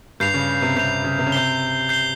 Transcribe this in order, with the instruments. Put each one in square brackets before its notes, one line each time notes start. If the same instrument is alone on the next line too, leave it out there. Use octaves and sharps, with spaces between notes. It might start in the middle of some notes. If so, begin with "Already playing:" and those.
[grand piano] G2 [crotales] G6 C7 F7
[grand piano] C#3
C3
[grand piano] C3 [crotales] G6 C7 F7
[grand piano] C#3
C3
C#3
[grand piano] C3 [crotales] G6 C7 G7
[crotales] G6 C7 G7